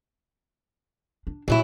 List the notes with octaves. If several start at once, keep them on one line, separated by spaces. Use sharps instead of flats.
D4
A#2 E3 F#3 E4